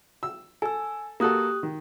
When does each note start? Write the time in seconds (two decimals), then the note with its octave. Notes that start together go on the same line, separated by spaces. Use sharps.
0.23 E6
0.62 A4 G#5 E6
1.20 A#3 F#4 G4 A4 D#6 F#6
1.63 D#3